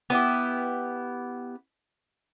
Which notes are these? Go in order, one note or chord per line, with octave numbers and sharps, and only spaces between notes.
B3 E4 G4